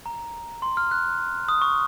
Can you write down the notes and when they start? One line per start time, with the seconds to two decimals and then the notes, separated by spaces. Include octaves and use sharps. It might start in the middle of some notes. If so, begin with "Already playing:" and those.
0.06 A#5
0.62 C6
0.77 F6
0.91 F#6
1.49 D#6
1.62 C#6